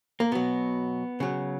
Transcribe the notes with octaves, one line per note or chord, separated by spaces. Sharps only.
A#3
B2 F#3 B3
C#3 F#3